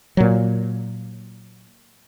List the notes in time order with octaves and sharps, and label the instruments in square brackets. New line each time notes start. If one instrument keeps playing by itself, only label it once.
[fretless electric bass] A#2 F#3